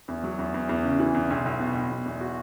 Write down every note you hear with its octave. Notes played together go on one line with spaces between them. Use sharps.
E2
F#3
E2
E2
E2
C#3
E3
E2
B1
B1
B2
B1
B2
E2
F#4